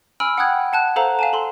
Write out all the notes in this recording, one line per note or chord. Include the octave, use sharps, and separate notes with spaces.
G#5 B5 E6 F6 D7
F#5 G5 D#6 F#6 G#6
F#5 A5 F#6
A4 C5 F5 F#5 A#5
F5 G#5 A5
A4 C6